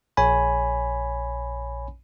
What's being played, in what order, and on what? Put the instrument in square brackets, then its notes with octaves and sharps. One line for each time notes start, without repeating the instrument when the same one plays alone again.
[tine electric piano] A#1 C#5 G#5 B5